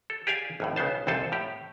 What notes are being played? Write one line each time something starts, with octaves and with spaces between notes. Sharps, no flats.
A4
G4 G#4 D5 F5 G#5
G#1 F2 A2
B1 C#3 B3 C5 A5
C2 F2 A#2 A4 C5 A5
A2 G4